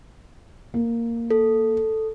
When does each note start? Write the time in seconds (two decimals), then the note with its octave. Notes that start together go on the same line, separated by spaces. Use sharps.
0.74 A#3
1.30 A4